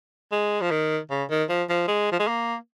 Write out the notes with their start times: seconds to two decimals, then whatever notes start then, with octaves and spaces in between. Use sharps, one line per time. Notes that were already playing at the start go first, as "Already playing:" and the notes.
0.32 G#3
0.61 F3
0.71 D#3
1.10 C#3
1.30 D#3
1.49 F3
1.69 F3
1.88 G#3
2.12 F3
2.19 G#3
2.28 A#3